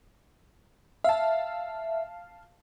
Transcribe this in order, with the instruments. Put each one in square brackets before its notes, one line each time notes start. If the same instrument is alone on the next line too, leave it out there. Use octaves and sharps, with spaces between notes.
[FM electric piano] E5 [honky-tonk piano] F5 A5